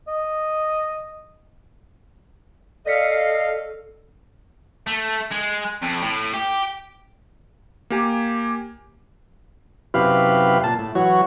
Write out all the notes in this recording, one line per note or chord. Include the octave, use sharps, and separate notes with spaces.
D#5
A4 D5 D#5 F5 B6 C#7
A3
G#3
F2
A2
G4
A#3 G4 G#5
F#2 C3 E4 G4 B4 F5
A#2 A5
A2
E3 F#3 F#4 C#5